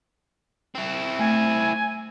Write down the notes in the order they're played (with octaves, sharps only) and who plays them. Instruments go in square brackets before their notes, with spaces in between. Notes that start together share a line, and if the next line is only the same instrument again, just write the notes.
[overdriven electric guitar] C4 E4
[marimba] A3 [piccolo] G#5